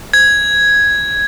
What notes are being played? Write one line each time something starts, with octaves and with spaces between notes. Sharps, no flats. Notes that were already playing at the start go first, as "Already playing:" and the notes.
G#6